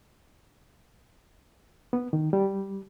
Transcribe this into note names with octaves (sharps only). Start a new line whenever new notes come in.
B3
D#3
G3